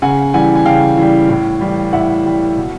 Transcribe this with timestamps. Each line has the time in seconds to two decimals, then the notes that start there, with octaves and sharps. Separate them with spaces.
0.02 C#3 F#5 G#5
0.34 E3 G3 F#5 G#5
0.55 G#5
0.65 C#3 F5 G5
0.97 E3 G3
1.29 A2
1.61 E3 G3
1.93 A2 E5 F#5
2.25 E3 G3
2.56 B2